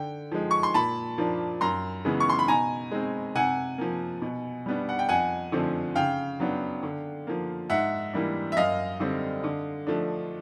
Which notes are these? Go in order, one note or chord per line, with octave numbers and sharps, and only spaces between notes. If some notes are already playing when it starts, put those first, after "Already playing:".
Already playing: D3 G5
F3 G#3
C#6
C6
A#2 A5 B5
F3 A#3 D4
F#2 A#5 C6
C#3 E3 G#3 B3
C#6
C6
B5
B2 G#5 A#5
G#3 C4
C3 F#5 G#5
F3 A#3
B2
G3 B3 D4
F#5
G5
F2 F#5 G#5
D3 F3 A3 C4
C#3 F5 G5
F#3 B3 D4
D3
F3 A#3
G#2 E5 F#5
E3 G3 A#3 D4
E5
F#2 D#5 F5
D3 G3 C4
D3
F3 A3 D4